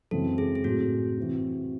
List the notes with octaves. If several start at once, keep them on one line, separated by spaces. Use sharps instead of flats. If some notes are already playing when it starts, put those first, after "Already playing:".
F#2 C#3 E3 G#3 C4 A4
G#4
G#4
A2 F#3 C4 F#4
C3 E3 C4 F#4